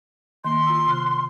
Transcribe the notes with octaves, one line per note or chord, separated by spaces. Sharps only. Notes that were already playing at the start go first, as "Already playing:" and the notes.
D#3 A#3 C6
F4 A#5 E6
C3 F6 F#6